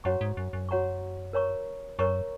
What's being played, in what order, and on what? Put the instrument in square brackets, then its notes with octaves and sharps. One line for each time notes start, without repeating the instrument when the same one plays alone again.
[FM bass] F#2 [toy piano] F#4 C#5 F#5 A#5 C#6
[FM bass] G#2
F#2
F#2
[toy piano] F#4 C#5 F#5 A#5 C#6
A#4 C#5 A#5 C#6
[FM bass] F#2 [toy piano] A#4 C#5 A#5 C#6